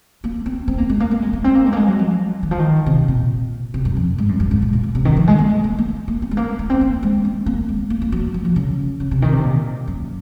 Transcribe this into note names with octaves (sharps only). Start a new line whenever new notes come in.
A#3
C4
C4
A#3
G#3
A#3
A#3
G#3
A#3
C4
A#3
G#3
A#3
G#3
F#3
F3
D#3
F3
D#3
C3
A#2
C3
F#2
F2
G#2
F#2
F#2
G#2
A#2
A#2
A#2
C3
D#3
F3
G#3
A#3
G#3
A#3
A#3
A#3
C4
G#3
A#3
A#3
C4
A#3
G#3
C4
A#3
G#3
A#3
A#3
F#3
F#3
F3
C#3
C#3
C3
D#3
C3
A#2
F#2